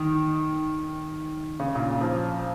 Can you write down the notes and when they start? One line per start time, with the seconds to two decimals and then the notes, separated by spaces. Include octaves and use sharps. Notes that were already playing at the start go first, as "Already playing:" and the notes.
Already playing: D#3
1.60 C#3
1.75 A#2
1.80 C#3
2.01 F3